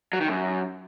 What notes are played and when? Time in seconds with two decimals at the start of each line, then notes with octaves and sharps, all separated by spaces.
0.13 F#3
0.21 D#3
0.28 F#2